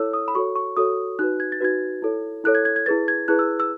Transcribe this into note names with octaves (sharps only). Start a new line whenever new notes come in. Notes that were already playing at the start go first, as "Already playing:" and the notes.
Already playing: E4 A4 C#5 E6
D#6
B5
F#4 A4 C#5 C#6
C#6
F#4 A4 C#5 D#6
D#4 F#4 B4 F#6
G#6
A6
D#4 F#4 B4 G#6
E4 A4 C#5
E4 A4 C#5 F#6
G#6
G#6
G#6
E4 G#4 B4 A6
G#6
E4 G#4 B4 F#6
E6
E6